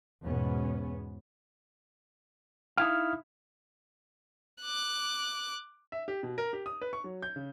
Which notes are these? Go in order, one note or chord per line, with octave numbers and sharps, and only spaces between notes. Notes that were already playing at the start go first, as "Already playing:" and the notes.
E2 G#2 B2 B3 C#4
D#4 E4 F5 F6
D6 F#6
E5
G4
B2
A#4
G4
D#6
B4
C#6
F#3
G6
C#3